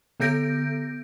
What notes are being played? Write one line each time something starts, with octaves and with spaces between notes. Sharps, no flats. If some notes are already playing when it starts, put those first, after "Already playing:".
D3 B3 A4 G6 A#6 D7